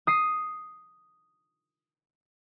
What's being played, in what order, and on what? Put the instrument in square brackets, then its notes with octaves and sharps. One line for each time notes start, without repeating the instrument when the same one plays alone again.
[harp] D#6 C7 D#7